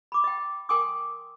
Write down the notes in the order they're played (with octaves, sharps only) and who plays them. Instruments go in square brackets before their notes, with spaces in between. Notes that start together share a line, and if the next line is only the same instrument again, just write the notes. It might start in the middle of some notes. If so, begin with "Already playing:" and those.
[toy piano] B5 D6
D#5 G5
A#4 G5 G#5 C6 D6 D#6